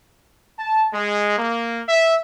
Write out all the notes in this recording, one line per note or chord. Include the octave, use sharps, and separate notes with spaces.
A5
G#3
A#3
E5